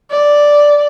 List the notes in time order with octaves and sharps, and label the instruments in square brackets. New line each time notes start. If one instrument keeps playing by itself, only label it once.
[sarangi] D5